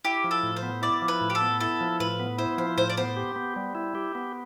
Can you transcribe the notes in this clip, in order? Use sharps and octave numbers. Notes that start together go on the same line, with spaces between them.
E4 G4
F3
A4
A2
C5
B3
E4 D5
F3
B4
A2
G4
A4
B3
E4 A4
F3
A2 B4
B3
E4 C5
F3 C5
A2 C5
D5
B3 C5
G4
B3
G3
E4
G4
B3